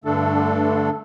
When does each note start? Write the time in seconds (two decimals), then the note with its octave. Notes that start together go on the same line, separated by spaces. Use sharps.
0.04 G2 D3 A3 D4 A4